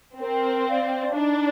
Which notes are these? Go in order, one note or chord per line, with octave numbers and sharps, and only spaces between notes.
C4 A#4
D5 F5
D4 D#4